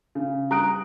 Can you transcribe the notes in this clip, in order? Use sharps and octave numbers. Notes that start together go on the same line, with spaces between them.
C#3
G3 A#5 D#6 F#6 D7